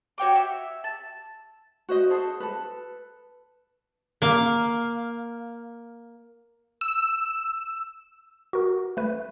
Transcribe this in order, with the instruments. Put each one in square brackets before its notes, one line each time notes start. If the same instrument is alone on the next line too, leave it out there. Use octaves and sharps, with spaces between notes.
[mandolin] F#4 C#5 G5 D6
E5
A5
[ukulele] F#4 C5 D#5
G#4 A4 C5
A4 B4
[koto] A#3 F5
[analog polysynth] E6
[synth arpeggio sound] F#4 A#4
A3 B4